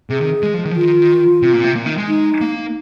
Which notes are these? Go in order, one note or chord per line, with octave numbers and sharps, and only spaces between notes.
C3 G#4
D#3
G#3
F3
D#3
F3
D#3 F4
C3
A#2
C3
A#2
D#3
G#3
D#4
A#3